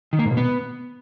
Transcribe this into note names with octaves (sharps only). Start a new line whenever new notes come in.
D#3
A#3
G#2
B2
B3